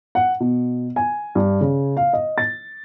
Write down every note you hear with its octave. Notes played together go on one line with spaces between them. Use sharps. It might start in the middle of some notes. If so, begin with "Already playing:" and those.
F#5
B2
G#5
G2
C#3
F5
D#5
A6